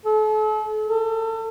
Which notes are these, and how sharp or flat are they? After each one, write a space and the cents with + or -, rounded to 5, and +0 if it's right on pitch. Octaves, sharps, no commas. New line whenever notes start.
A4 -40
A4 +35